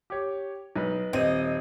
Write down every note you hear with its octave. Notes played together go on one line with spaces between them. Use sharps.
G4 C#5
B1 D#4 B4
D#1 C4 D#5 D#7